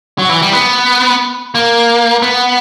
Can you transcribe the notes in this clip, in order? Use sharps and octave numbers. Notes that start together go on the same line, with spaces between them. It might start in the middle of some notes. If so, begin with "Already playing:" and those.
F#3
E3
G3
B3
A#3
B3